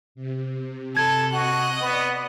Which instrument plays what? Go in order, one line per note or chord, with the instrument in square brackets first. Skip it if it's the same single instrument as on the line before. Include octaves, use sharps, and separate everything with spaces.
[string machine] C3
[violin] A4 B5 [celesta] G#6
[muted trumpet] F#4 [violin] D#5 F#6
[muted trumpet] B3 [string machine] D5